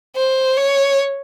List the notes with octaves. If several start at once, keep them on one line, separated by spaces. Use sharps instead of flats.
C5
C#5